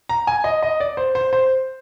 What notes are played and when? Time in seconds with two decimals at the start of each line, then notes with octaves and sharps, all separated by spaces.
0.09 A#5
0.27 G#5
0.44 D#5
0.62 D#5
0.80 D5
0.97 C5
1.15 C5
1.33 C5